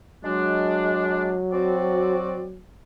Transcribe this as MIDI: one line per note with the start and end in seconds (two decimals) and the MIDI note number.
0.24 2.62 54
0.24 1.38 56
0.24 1.38 62
1.52 2.43 60
1.52 2.43 66
1.52 2.43 74